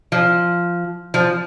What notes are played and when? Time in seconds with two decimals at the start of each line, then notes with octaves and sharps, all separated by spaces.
0.12 F3
1.14 F3